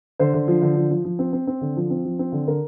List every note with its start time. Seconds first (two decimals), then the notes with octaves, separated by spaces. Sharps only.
0.19 D3 C5
0.34 D3
0.48 F3
0.62 D3
0.76 F3
0.91 F3
1.05 F3
1.19 C4
1.33 C4
1.47 C4
1.61 D3
1.77 F3
1.90 C4
2.05 F3
2.19 C4
2.32 D3
2.47 D3 A#4